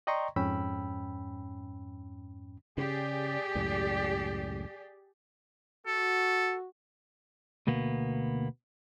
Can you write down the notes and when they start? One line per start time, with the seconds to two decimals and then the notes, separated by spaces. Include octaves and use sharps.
0.07 D5 D#5 G5 A#5 C6 C#6
0.36 F2 G#2 C#4 G5 B5 E6
2.78 C#3 G4 G#4 D5
3.55 C#2 F#2 A2
5.87 F#4 A4
7.67 D2 B2 A#3 B3